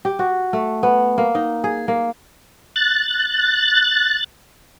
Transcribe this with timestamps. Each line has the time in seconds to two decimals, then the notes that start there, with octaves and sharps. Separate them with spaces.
0.05 G4
0.19 F#4
0.53 A3
0.83 B3
1.18 A#3
1.35 D#4
1.64 G#4
1.88 A#3
2.76 F#6 A6